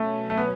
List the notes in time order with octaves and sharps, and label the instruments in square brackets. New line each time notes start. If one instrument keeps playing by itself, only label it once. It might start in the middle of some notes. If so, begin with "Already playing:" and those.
Already playing: [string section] B2 F#3 C#4 [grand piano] A3
[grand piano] A3
B3